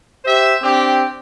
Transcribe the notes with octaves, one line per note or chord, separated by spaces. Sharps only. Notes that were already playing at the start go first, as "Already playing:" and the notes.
G4 C5 E5
C4 D4 G4